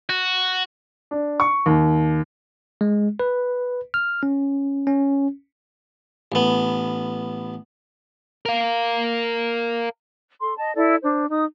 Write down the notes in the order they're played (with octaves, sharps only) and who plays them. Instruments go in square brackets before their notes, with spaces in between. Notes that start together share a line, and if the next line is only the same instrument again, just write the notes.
[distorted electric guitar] F#4
[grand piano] D4
C#6
D#2
[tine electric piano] G#3
B4
F6
C#4
C#4
[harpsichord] A1 B3
[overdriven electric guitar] A#4 F5
[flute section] A4 C6
D#5 A5
E4 A4 D5
D4 C5
D#4 D#6